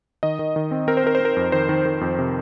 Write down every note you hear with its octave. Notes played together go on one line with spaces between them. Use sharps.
D#3 D#5
D#3
D#3
C4
C4 A#4
C5
C4 A#4
C5
C4 A#4
F2
D#3 C5
D#3
D#3
F2
C3